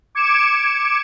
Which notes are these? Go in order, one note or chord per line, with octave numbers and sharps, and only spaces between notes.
D6 G#6 C#7 D7 E7